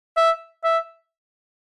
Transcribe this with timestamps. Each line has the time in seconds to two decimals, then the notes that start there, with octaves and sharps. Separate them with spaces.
0.17 E5
0.64 E5